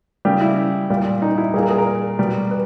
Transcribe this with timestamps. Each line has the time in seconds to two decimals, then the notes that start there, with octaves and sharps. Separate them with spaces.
0.25 C#3 G3 G4
0.41 E4
0.90 A#2 G3
1.22 D#4
1.38 E4
1.54 A#2 G3 G#4
1.62 A#4
1.70 G#4
1.78 A#4
2.19 B2 G3
2.51 B4